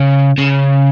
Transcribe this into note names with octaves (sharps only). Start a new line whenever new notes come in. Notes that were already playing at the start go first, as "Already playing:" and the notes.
Already playing: C#3
C#3